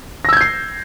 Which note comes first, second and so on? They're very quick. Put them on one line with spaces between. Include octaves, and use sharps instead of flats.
A#6 E6 G#6 G6 C7